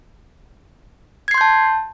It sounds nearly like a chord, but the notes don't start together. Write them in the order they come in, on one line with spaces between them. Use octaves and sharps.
G#6 C7 C6 G6 A5